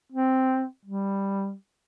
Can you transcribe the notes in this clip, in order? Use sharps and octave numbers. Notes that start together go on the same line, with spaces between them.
C4
G3